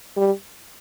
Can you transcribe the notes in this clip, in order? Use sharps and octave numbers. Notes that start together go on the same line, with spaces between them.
G3